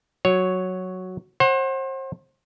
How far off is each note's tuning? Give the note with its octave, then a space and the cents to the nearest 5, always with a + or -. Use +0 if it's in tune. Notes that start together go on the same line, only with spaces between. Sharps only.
F#3 +0 C#5 +0
C5 +35 F#5 +10